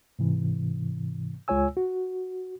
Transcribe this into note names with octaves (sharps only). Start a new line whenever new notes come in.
G#2 C3 E3
C#2 G#3 F4 C#5 G#5 E6
F#4